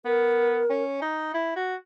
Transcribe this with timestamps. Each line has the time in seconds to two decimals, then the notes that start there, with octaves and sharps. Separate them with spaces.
0.05 B3 A#4
0.70 C#4
1.02 D#4
1.34 E4
1.56 F#4